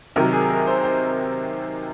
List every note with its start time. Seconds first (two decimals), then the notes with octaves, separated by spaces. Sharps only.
0.16 C3 D#3 F#3 A#4
0.33 G#4
0.50 A#4
0.67 C5
0.83 C5